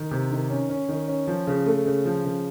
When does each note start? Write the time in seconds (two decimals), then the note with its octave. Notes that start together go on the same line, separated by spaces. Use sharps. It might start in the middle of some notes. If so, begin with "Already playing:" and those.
Already playing: D#3
0.11 C3
0.31 D#3
0.50 C#4
0.70 C#4
0.89 D#3
1.08 C#4
1.27 F3
1.47 C#3
1.66 A3
1.85 C#3
2.05 F3
2.25 C#3